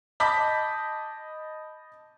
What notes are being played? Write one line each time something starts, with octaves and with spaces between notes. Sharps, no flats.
D#5 A5 B5 D6 G6 B6